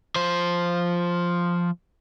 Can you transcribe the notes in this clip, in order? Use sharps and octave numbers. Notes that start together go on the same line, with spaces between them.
F3 C5